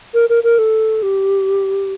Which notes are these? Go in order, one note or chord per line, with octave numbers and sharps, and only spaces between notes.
A#4
A#4
A#4
A4
G4